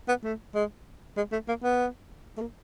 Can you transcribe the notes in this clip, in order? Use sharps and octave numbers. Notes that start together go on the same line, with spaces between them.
B3
A3
G#3
G#3
A3
A#3
B3
A3
A#3